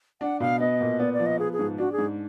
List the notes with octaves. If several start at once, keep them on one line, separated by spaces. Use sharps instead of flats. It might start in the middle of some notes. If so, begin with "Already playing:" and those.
D4 F#5
B2 F5
B3 D#5
A#2
B3 D5
D5
F3
D#5
B3 G#4
G#4
G#2
D4 F#4
G#4
G#2